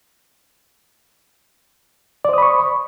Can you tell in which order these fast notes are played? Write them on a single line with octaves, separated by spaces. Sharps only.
D5 C5 D#6 B5 C#6